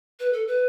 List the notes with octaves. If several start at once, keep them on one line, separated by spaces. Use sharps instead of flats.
B4
A4
B4